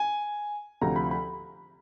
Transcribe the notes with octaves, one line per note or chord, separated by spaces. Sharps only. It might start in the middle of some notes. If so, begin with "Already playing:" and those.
Already playing: G#5
D2 C3 F3 A#5
B5
B5